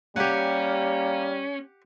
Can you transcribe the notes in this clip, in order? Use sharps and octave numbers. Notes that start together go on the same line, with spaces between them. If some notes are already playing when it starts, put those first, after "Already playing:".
G3 A#3 C#4 G4 F#5